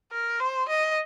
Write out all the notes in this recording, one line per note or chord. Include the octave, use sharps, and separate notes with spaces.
A#4
C5
D#5